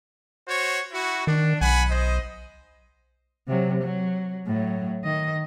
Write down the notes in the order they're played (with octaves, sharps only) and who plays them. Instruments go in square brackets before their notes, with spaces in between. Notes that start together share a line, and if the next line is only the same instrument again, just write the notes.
[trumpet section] F#4 C5 C#5
E4 F#4
[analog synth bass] D#3 [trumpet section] D4
[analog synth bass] B1 [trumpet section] F#5 G#5 B5
[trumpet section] C5 D#5
[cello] C3 F#3
F#3
A2 F#3
D#3 D#5